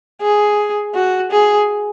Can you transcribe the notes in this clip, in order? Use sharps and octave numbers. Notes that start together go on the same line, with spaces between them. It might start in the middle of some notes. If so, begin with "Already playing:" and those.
G#4
F#4
G#4